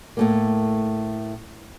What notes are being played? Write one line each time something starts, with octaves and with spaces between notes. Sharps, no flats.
A2 A3 A#3